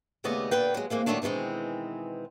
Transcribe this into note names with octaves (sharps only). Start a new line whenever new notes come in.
D#2 C#3 A3 B3 D5 D#5
A#2 D3 B4 G5
F#3 G#3
E3 G#3 A#3 C4
A#2 D#3 F#3 G3 A3 D4
B2 D#3 E3 G#3 C4